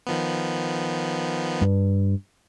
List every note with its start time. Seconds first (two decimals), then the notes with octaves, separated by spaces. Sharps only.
0.07 D#3 F3 B3
1.61 G2